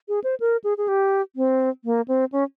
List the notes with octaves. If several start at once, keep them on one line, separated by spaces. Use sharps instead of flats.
G#4
C5
A#4
G#4
G#4
G4
C4
A#3
C4
C#4